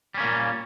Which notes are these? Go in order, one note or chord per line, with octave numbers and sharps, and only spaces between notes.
A#2 G3 A#3 C#4